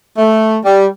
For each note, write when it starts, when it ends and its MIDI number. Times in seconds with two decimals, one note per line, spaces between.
0.18 0.58 57
0.65 0.86 55